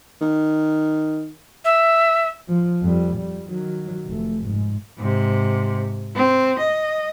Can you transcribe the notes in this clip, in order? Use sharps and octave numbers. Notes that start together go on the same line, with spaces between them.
D#3
E5
F3
F2 G3
F2 G3
D#3 F#3
F1 A3
G#2
G#2 C3
C4
D#5